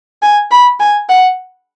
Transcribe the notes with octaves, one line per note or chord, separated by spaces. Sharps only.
G#5
B5
G#5
F#5